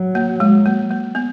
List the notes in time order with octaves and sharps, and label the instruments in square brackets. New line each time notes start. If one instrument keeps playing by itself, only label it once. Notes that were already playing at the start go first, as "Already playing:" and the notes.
Already playing: [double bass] F#3
[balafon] A#3
G#3
A#3
A#3
B3